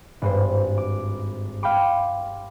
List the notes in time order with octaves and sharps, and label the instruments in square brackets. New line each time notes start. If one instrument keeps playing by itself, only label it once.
[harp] G#1 G2 C5
D6
F5 G5 B5 C6 D6